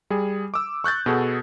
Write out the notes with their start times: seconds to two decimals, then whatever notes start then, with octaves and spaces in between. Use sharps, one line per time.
0.10 G3 G#4
0.54 D6 E6
0.84 C#6 F#6 G6 A6
1.06 B2 F#4 G#4 A4